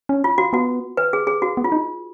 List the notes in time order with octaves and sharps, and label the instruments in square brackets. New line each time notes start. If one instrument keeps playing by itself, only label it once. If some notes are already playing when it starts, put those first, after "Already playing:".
[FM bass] C#4
[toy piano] F4
F#4
[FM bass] B3 [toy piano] F#4
[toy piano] B4
G#4
G#4
F#4
[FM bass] B3
[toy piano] F4
[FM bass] D#4